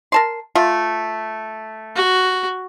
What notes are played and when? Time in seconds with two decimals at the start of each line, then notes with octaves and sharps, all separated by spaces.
0.12 A#4 A5 C6
0.55 A3 F4
1.96 F#4